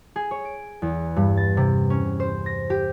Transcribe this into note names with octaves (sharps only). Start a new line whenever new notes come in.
G#4
C#5
D7
E2
G2
A6
C3
C#4
C5
A#6
G4